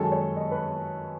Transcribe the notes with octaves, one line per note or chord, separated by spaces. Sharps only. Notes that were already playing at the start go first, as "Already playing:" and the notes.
Already playing: F#2 D#3 G#3 C#4 A4
C#5
D#5
B4